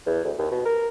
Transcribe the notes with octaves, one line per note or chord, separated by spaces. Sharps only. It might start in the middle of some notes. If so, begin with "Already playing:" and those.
E2
D2
D#2
B2
A#4